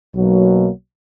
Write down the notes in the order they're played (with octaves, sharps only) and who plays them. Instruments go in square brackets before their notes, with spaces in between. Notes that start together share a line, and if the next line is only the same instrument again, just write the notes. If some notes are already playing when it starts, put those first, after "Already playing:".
[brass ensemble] B1 B2 F#3 A#3